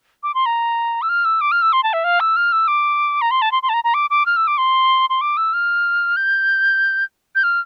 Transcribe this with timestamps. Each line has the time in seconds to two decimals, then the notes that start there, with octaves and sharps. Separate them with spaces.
0.23 D6
0.34 C6
0.46 A#5
1.02 E6
1.09 F6
1.25 E6
1.41 D6
1.52 F6
1.62 E6
1.73 C6
1.83 A5
1.93 E5
2.04 F5
2.20 E6
2.36 F6
2.52 E6
2.67 D6
3.21 A#5
3.31 C6
3.42 A5
3.52 C6
3.63 C6
3.69 A5
3.74 A#5
3.84 A#5
3.94 D6
4.10 D6
4.26 F6
4.36 E6
4.47 D6
4.58 C6
5.09 C6
5.21 D6
5.37 E6
5.53 F6
6.16 G6
7.35 G6
7.43 F6